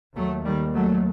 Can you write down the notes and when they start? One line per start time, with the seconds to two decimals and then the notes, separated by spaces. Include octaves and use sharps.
0.16 D#2 F#3 A3
0.45 D#3 G3
0.75 F#3 A3